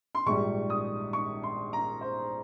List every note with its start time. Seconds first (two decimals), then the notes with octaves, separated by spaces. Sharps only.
0.15 C6
0.26 A#1 G#2 G3 C#6
0.70 D#6
1.13 C#6
1.43 C6
1.73 A#5
2.01 C5